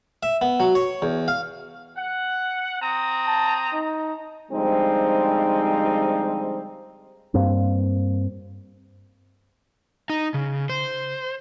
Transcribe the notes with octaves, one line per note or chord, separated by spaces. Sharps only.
E5
B3
F#3
C#5
E2
F5
F#5
C4 A#5 D#6
A5
D#4
D3 F3 G3 G#3 C4 D#4
G2 A#3 C4
D#4
C#3
C5